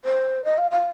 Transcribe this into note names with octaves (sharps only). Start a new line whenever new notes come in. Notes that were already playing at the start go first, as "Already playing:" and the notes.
C5
D#5
F5
F5